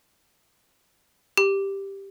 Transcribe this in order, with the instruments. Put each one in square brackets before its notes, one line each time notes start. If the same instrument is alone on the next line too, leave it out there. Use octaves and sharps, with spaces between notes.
[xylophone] G4